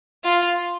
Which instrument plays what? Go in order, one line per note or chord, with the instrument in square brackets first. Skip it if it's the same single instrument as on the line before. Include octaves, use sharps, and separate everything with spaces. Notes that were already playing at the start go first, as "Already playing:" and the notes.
[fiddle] F4